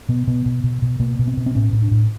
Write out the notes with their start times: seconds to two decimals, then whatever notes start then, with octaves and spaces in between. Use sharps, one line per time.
0.09 B2 B3
0.27 B2 B3
0.46 B2
0.64 B2
0.82 B2
1.00 B2 A#3
1.19 B2
1.27 C4
1.37 B2
1.46 C4
1.55 A2 C#4
1.73 A2
1.82 D4
1.91 A2